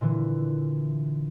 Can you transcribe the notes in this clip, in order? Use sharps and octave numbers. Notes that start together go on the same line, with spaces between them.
A#2 D3 E3